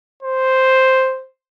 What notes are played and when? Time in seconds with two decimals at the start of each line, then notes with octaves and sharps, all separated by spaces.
0.23 C5